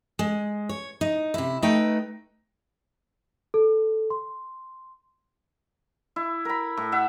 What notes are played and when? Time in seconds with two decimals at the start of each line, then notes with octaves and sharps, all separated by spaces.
0.19 G#3
0.69 C#5
1.01 D#4
1.34 C3 E4
1.62 A3 D#4 B4 G5
3.54 A4
4.10 C6
6.16 E4
6.45 A#4 B5
6.77 A2
6.92 E5 F#5